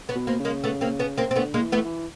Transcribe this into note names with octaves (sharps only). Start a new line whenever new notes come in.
B3 C#4
B2
A#3 C4
C#3
G#3 A#3
A3 B3
A#3 C4
B3 C#4
A#3 C4
C4
D3 A3 B3
G#3 A#3
E3
A3 B3
E3